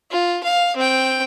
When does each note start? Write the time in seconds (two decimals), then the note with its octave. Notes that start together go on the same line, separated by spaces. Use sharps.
0.11 F4
0.43 F5
0.76 C4 G5